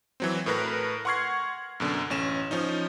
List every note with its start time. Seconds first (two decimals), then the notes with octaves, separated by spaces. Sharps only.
0.20 E3 F#3 C4
0.46 A2 A3 A#4 B4 A#6
1.05 F#5 C6 C#6 F6 G#6 C7
1.80 F#2 B2 D3
2.10 A1 C#4 E7
2.51 F3 C#4 D#4